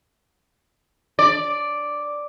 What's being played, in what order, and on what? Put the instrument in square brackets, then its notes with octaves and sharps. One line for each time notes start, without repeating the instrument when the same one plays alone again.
[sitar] D5